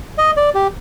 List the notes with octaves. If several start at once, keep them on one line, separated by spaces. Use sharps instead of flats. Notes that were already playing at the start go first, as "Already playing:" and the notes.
D#5
D5
G4